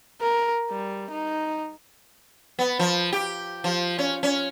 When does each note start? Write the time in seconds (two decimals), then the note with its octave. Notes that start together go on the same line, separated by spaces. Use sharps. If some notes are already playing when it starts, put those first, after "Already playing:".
0.21 A#4
0.71 G3
1.11 D#4
2.59 B3
2.79 F3
3.13 G4
3.64 F3
3.99 C#4
4.23 C#4